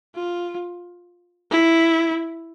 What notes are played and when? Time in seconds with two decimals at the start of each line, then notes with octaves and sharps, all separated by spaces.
0.15 F4
1.51 E4